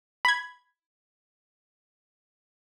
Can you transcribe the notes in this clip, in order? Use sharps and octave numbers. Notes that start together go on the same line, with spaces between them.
B5 G#6